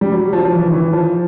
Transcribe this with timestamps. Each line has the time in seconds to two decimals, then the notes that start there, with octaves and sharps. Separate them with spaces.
0.01 G3
0.13 F#3
0.33 F3
0.45 F3
0.52 E3
0.67 D#3
0.73 E3
0.93 F3